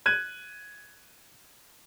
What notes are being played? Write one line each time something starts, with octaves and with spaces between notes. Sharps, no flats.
F#6 G#6 D#7